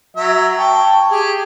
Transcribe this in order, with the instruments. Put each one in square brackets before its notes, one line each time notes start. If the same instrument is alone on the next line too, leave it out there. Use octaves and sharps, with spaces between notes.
[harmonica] F#3 E5
G5 A5 C#6
G4 G#4